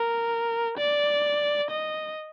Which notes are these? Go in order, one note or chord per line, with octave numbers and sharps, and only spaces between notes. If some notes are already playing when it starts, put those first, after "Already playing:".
Already playing: A#4
D5
D#5